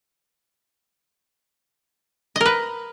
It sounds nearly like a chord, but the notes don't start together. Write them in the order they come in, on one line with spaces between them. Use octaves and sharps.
D#5 A#4 B4